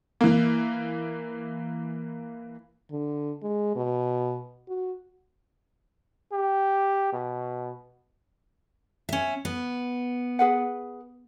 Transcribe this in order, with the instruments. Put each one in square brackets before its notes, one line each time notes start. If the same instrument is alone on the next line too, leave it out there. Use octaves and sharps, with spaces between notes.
[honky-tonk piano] E3 A#3
[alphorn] D3
G#3
B2
F#4
[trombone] G4
B2
[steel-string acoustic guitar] C#4 E5
B3
[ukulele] G#4 B4 F#5